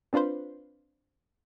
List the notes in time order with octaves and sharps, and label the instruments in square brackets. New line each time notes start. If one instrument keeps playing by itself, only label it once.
[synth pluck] C4 D4 F4 B4 C5